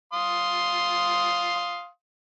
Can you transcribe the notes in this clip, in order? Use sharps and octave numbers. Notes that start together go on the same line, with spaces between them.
F5 C6 D#6